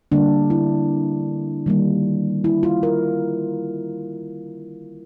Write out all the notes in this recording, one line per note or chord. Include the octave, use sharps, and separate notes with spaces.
D3 G3 A#3 D4
E4
D#3 G3 A#3
E4
F4
A#4